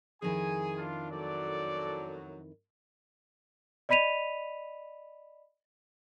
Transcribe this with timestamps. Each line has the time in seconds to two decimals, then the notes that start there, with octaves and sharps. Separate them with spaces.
0.22 F2 D#3 E4 G#4 G#5
0.77 D4 F4
1.10 F#2 A2 F#3 A4 D5
3.89 D5 D#5 B5 B6 D#7 F7